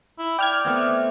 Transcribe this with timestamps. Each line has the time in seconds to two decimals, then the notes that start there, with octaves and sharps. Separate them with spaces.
0.19 E4
0.39 D5 G5 F6 G#6
0.65 A3 B3 C4